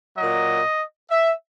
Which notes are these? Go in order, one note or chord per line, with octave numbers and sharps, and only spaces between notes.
A#2 F#3 D#5
E5